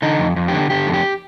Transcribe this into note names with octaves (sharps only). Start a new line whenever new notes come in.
D3 D#4
F2
F2
D3 G4
D3 G4
F2
G4